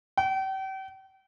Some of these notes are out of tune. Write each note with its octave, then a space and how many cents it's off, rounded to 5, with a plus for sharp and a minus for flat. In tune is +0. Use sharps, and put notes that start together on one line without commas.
G5 -40